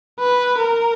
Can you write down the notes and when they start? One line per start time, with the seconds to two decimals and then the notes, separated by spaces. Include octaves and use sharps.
0.20 B4
0.58 A#4